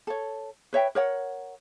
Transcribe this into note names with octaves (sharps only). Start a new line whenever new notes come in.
A4 C#5
B4 C#5 E5 G5
A#4 C#5 F#5